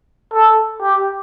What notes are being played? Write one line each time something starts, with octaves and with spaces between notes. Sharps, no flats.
A4
G4